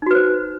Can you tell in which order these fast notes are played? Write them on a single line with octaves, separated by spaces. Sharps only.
D#4 F#4 B4 C5